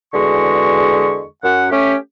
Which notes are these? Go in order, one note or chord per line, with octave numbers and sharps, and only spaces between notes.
E2 D3 G#3 F#4 C#6
F#2 F#5
A3 C#4 G4